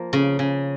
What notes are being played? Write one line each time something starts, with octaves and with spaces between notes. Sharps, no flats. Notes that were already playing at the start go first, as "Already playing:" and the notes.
Already playing: F3 A#3
C#3
C#3